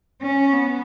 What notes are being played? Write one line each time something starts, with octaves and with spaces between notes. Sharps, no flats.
C#4
B3